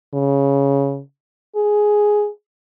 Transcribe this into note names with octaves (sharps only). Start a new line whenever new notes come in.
C#3
G#4